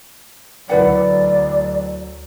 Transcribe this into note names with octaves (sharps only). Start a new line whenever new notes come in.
D2 F#3 E4 B4 D5 F#5